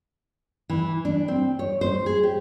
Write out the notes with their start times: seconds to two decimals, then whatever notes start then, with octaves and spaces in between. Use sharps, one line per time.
0.70 E3
1.05 D4
1.28 C4
1.59 C#5
1.81 C5
2.06 G#4
2.23 G4